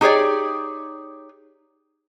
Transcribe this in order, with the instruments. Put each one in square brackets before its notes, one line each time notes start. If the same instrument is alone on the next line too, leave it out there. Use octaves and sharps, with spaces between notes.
[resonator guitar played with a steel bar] D#4 G4 G#4 C#5 D5